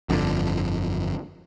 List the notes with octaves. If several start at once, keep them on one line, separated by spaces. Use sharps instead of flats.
G1 F2 G#2 D3